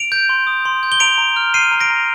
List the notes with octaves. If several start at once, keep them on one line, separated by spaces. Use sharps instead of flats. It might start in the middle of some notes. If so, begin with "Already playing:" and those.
Already playing: D7 F7
G6
C6
D#6
C6
G6
G7
A#5 D7 F7
A#5
F6
F6 C7 D#7
A#5 D#7
A#6 D7
A#5